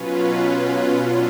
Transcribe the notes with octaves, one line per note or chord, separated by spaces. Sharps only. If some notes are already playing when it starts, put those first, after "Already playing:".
Already playing: B2 F#3 C#4 F4 B4
F#3 B3 D4 F4